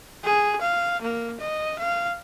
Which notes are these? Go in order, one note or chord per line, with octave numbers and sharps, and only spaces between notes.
G#4
F5
A#3
D#5
F5